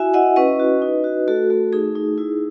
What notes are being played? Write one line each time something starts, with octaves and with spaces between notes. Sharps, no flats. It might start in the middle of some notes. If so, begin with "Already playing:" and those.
Already playing: E4 F#4 E5 G#5
E4 D#5 F#5
C#4 B4 D#5
F#4
D#4
F#4
A3 F#4 A4
A3 F#4
D#4 G#4
D#4
E4